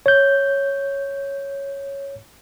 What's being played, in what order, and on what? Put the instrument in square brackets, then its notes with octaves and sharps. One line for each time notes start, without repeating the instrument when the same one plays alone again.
[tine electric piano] C#5 G6